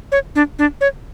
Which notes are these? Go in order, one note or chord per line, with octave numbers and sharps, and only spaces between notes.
C#5
D4
D4
C#5